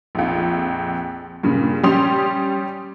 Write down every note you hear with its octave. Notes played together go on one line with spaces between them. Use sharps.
A#1 F2
G2 A#2 C#3
G3 C#4 G4 C6 D#6 F7